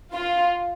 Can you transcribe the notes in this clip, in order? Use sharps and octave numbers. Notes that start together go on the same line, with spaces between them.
F4